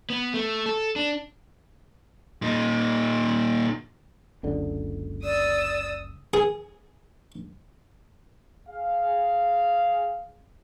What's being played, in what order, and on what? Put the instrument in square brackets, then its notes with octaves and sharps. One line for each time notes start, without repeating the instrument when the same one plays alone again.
[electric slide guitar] B3
A3
A4
D4
[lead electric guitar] A#2 D#4
[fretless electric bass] F#1 C#2 D3
[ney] D5 [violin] D#6 E6
[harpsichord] G#4
[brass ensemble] G#4 F5